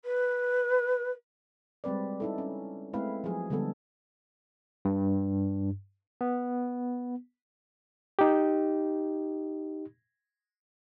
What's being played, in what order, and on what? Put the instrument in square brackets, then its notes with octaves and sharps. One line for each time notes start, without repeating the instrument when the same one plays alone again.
[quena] B4
[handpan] G3 G#3 C4 B4 D5
D#4 E4 A4
C#4
G#3 A3 C4 E4 B4 F5
F3 F#3 G#4
D3 G3 G#3 B3 A4
[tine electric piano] G2
B3
[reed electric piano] D#4 G4